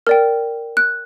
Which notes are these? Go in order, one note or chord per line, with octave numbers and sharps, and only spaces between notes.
A#4 D5 G5 F6
F#6